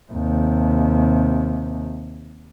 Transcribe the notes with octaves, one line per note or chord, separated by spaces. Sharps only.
D#2 C3